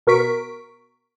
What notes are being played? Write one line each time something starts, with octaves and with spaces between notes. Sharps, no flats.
B2 A#4 C#6 B6 D7